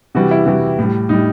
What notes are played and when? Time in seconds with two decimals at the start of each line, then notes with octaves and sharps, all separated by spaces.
0.15 C3 E3 G3 F#4
0.31 E4
0.46 C3 E3 G3 F#4
0.79 A2 G3
1.09 A2 G3 D#4